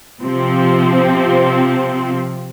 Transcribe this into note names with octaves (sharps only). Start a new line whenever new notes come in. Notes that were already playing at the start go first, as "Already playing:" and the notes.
C3 F3 C4